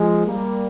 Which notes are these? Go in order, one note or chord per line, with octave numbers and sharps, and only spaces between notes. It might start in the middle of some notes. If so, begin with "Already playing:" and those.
Already playing: F3 G#3
G3 A#3